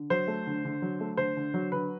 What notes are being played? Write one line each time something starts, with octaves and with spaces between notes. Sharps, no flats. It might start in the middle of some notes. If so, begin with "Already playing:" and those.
Already playing: D3
F#3 C5
A3
D3
D3
F#3
A3
D3 C5
D3
F#3
D3 B4